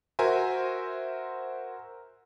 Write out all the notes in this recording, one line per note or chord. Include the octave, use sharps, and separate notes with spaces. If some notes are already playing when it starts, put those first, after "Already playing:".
F#4 A#4 C5 E5 G#5